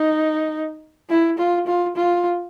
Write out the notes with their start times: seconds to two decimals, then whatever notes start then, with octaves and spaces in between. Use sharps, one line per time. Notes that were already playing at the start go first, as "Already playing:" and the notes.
Already playing: D#4
1.10 E4
1.38 F4
1.67 F4
1.96 F4